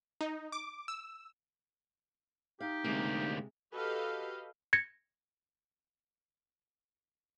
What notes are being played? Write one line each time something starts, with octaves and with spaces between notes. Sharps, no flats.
D#4
D6
E6
D#4 G4 F5
D2 C3 G#3 A#3
F#4 G4 A4 B4 D#5 F5
G#6 A#6 C#7